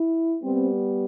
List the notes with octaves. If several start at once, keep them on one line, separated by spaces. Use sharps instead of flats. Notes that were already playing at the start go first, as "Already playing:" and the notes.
Already playing: E4
G3 B3 C4